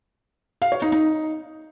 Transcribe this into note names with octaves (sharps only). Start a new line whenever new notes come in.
F5
C#5
D#4
D#4